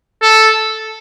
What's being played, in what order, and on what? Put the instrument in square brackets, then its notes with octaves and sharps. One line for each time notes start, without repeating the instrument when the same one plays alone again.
[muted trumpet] A4